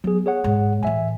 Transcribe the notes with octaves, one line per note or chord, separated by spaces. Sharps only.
F#3 B3 G#4
G#4 C#5 F#5
G#2 G#3
A2 E3 E5 G#5